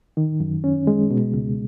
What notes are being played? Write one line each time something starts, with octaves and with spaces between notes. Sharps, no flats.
D#3
F#2
C#4
G#3
B2
C#2